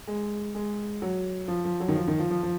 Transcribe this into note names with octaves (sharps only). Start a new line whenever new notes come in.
G#3
G#3
F#3
F3
F3
F#3
D#3
F3
D#3
F3
F3
F3